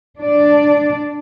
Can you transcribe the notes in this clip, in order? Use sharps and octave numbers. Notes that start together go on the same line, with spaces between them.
D4 D5